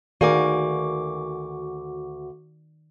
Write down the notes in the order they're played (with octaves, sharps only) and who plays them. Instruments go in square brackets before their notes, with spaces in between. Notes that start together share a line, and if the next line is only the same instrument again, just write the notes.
[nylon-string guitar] D2 G#4 A#4 [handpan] D#3 D5 F5 [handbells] F#4 D6